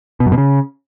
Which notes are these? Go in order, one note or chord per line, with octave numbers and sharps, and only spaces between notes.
B2
F#2
B2
C#3